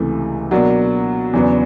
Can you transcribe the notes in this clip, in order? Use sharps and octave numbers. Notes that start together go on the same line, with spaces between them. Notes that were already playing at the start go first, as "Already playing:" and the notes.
Already playing: C#2 C3 E3 A3
B2 F#3 A#3 D4 F#4
E2 C#3 F#3 B3 D4